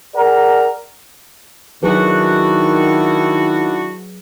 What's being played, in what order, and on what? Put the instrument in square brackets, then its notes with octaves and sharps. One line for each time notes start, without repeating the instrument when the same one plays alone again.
[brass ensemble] G#4 A#4 D5 F#5 A#5
[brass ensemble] D#3 [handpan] F#3 G#4 B4 [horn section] D4 E4 F#4